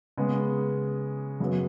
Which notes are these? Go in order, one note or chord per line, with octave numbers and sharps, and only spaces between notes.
C#3 G#3 B3
F#2 C#3 F#3 B3